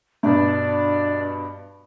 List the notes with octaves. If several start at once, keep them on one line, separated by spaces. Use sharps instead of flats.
G2 B2 D4